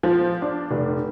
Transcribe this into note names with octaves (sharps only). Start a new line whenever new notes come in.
F3
D4
F1